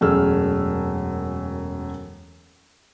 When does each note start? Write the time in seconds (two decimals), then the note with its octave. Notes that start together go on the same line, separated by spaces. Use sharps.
0.01 E1 F#2 A3 G#4 E6 F6